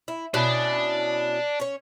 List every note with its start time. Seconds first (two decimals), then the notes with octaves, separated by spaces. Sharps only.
0.08 E4
0.34 B2 C#4 D4 E4
1.60 C#4 C#5